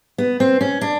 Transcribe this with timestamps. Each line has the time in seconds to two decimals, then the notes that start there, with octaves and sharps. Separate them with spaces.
0.18 B3
0.40 C4
0.61 C#4
0.81 D4